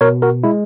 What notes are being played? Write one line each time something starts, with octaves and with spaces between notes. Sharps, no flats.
B2 A#4 C#5
F#4 A#4
G#3 E4